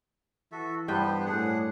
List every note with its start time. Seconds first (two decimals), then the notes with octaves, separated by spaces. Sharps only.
0.52 E3 F#4 A4 E5
0.88 G2 B3 B4 C5 G5
1.26 A2 D4 G#4 F#5